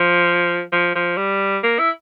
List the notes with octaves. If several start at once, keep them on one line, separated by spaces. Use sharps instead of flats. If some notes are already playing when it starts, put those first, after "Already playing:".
Already playing: F3
F3
F3
G3
A#3
E4